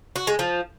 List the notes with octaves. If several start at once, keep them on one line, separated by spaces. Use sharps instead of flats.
F#4
G#3
F3